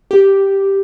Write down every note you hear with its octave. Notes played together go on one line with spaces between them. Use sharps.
G4